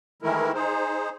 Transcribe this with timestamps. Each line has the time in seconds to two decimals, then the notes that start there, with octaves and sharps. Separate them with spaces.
0.22 D#3 E3 G#3 A3 E4 A#4
0.54 D#4 G#4 C5